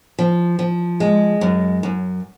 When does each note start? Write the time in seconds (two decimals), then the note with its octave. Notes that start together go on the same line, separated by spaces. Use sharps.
0.19 F3
0.59 F3
1.00 G#3
1.41 F#2
1.83 F#2